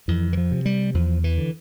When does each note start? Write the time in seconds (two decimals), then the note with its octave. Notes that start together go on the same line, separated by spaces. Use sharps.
0.08 F2 E3
0.33 E3
0.37 F3
0.51 C3
0.66 G3
0.94 E2 F3
1.24 E3
1.38 D3